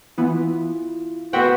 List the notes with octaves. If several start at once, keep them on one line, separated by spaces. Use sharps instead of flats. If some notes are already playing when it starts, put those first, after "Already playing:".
E3 B3 E4 F4
B3 F#4 C5 E5 F#5 G5